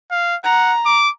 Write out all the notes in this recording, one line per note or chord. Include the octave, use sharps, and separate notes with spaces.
F5
F#5 A#5
D6